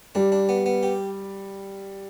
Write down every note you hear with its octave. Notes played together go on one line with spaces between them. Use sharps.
G3 D4
D4
B3
B3
G4